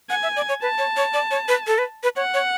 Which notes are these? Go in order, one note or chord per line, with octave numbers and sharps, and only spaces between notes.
F#5 G#5
E5
D5
C#5
B4 A5
C#5
C#5
D5
C#5
B4
A4
B4
B4
C#5 F#5
C#5